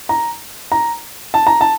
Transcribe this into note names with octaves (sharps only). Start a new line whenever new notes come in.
A#5
A#5
A5
A#5
A5